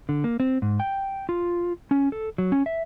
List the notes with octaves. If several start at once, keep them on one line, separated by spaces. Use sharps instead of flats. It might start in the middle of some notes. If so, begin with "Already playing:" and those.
D3
A#3
C4
G#2
G5
F4
C#4
A4
F#3
C#4
E5